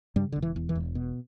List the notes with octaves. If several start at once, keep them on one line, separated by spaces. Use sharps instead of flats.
G2 C#3 G3
E1 D3
E3
E2
E3
E1
B2